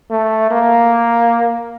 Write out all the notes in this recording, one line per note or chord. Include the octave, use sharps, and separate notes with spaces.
A3
A#3